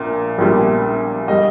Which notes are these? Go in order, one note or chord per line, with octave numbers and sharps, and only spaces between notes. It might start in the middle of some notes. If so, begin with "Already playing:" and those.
Already playing: A#1 A#2
A#1 A#2 G3
G3 D#5